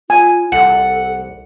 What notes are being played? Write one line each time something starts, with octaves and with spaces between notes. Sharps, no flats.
F4 G#5
C2 A4 F#5